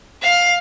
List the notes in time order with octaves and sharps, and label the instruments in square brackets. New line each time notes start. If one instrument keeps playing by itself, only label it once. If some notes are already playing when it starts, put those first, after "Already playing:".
[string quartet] F5